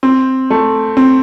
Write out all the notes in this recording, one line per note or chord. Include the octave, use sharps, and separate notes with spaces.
C4
A3
C4